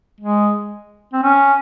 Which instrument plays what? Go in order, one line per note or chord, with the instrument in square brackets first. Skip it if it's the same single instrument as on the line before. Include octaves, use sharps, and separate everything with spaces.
[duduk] G#3
C4
C#4